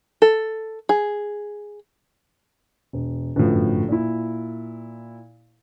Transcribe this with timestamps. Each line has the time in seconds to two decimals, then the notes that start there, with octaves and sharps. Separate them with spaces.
0.22 A4
0.89 G#4
2.93 E1
3.36 G1 F#2 A2 F3
3.88 A#2 E4